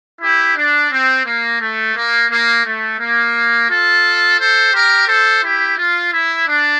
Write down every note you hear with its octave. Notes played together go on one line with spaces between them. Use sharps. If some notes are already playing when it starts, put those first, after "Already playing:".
E4 G4
D4
C4
A#3
A3
A#3
A#3
A3
A#3
F4 A4
A4 C5
G4 A#4
A4 C5
E4 G4
F4
E4
D4